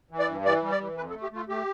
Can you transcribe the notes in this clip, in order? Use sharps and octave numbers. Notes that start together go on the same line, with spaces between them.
E3
D5
G2
E3 D5
G3
D5
E3
F2 B4
A4
A3
G4
A3 F4
A3 G4